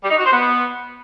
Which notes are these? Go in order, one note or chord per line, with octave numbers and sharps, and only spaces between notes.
G3
D#4
F#4
C5
B3